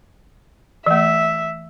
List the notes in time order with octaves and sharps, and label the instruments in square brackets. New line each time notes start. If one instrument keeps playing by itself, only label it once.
[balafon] E3 A3 [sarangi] E5